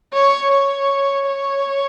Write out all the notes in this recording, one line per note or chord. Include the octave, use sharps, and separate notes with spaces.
C#5
C#5
C#5